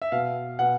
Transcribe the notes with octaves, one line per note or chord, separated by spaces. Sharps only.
E5
B2 F5
B2 F#5